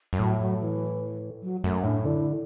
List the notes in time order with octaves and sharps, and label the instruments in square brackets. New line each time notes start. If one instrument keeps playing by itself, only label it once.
[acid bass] F#2
[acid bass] A2 [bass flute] F#3
[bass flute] F#3
E3
F#3
[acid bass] F#2 [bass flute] A3
[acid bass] A2 [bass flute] D4
[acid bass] D3 [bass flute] E4